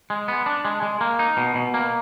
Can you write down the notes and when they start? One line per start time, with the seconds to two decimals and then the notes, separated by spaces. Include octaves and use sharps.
0.10 G#3
0.28 B3
0.46 D4
0.65 G#3
0.83 G#3
1.01 A#3
1.19 D#4
1.37 B2
1.55 B2
1.74 A#3